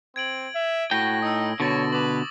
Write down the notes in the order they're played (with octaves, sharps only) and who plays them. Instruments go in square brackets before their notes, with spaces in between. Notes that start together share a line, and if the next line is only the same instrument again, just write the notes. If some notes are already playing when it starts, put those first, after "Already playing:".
[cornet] C4 [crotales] G#6 D7 F#7
[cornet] E5
[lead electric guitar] A2 G5 [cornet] F#4 [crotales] A#6
[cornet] D#4 [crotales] D#6 E6
[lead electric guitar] B2 D3 [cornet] C#5 [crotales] C#6 A6 A#6
[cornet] B4 [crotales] D6 F#7